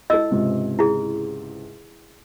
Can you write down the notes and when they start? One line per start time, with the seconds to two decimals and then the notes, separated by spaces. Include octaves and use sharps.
0.10 E4 A4 D#5 E6
0.31 C#2 G#2 C3
0.79 E4 G#4